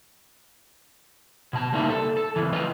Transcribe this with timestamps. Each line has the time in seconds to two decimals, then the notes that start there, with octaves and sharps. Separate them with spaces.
1.53 B2 A5
1.72 C#2 G3 A#3 D#4 E5 A5
1.90 A4
2.17 A4
2.36 C#2 C3 E3
2.53 F4 B4 D#5